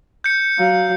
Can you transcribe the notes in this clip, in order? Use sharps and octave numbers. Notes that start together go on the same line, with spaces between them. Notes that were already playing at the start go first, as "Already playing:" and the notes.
G6 C#7
F#3 F5